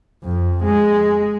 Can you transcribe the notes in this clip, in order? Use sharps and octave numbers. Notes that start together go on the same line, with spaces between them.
F2
G#3